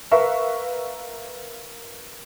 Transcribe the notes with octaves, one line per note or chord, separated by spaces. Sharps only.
A#4 B4 E5 F5 C#6